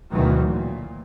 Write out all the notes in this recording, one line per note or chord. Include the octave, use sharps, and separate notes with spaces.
D2 B2 D#3 E3 F#3
A#2